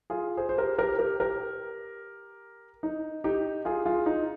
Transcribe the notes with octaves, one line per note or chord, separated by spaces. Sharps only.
F4 G#4
G#4 C5
C5
G4 A#4
G4 A#4
G4 A#4
G4 A#4
D#4
D#4 G4
F4 G#4
F4 G#4
D#4